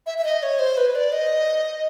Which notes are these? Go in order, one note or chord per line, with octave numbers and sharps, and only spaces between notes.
E5
E5
D#5
C#5
C5
B4
D5
D#5